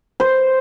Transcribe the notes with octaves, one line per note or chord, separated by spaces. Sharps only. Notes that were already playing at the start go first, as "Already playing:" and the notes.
C5